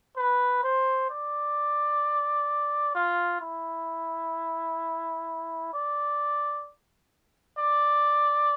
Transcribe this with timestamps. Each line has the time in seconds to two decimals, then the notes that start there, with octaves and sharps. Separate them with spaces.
0.17 B4
0.63 C5
1.10 D5
2.95 F4
3.41 E4
5.73 D5
7.58 D5